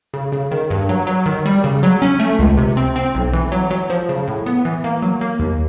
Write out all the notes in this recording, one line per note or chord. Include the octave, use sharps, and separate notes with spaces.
C#3
C#3
D#3
G2
F#3
F#3
D#3
G3
C#3
F#3
C#4
A3
C#2
C3
C4
C4
B1
E3
F#3
F#3
F3
C#3
A2
B3
E3
A#3
F#3
A#3
D#2